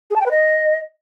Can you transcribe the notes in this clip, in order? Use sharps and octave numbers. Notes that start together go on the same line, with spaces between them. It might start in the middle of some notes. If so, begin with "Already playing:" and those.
G#4
A5
G5
B4
D#5